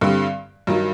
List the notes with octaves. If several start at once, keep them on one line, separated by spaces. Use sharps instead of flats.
G2 D3 G3 C4
G2 D#3 F#3